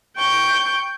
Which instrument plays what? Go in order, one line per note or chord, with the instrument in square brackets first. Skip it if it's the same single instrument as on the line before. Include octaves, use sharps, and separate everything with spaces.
[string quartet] G5 C#6 G6